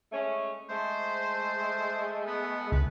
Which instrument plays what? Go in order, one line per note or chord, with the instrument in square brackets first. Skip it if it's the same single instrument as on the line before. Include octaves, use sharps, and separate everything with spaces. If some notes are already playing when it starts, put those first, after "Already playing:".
[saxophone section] G#3 A3 C#4
[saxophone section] G#3 A3 [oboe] C5
[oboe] B3
[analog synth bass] C#2 [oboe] B4